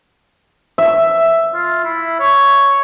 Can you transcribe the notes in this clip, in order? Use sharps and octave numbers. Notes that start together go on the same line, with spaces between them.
E5
F4
E4
C#5